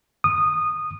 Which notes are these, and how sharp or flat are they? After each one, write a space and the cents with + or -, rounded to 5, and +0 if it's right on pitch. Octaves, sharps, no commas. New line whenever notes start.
D#6 -15